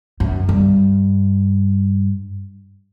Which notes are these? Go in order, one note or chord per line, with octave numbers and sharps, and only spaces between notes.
F#2
G2